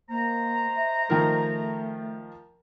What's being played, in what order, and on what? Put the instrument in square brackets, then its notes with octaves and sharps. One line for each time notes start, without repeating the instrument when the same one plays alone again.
[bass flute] A#3 [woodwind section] C5 D#5 A#5
[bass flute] E5
[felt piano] D#3 F3 A#4 [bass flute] A3